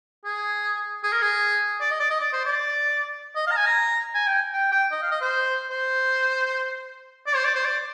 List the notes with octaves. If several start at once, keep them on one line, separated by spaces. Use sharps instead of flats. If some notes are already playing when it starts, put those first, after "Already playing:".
G#4
G#4
A#4
G#4
D5
D#5
D5
D#5
D5
C5
D5
D#5
F5
A#5
G#5
A#5
G#5
G5
G5
G5
D#5
F5
D#5
C5
C5
D5
C5
D5
C5
D5